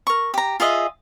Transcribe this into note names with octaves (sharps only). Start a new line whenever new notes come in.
A#4 C#6
G4 A#5
F4 G#4 D#5 E5